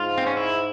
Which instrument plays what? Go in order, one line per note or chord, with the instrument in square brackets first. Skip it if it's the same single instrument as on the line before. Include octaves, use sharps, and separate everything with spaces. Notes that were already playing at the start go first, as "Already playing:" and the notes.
Already playing: [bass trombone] G#2 [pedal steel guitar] F4
[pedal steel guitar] C4
C#4
E4